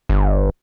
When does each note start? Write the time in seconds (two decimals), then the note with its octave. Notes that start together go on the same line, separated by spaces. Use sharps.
0.09 G1